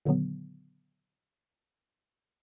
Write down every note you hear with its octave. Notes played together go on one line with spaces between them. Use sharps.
A#2 D3 D#3 F#3 B3